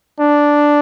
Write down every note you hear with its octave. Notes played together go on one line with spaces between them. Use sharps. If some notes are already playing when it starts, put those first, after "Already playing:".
D4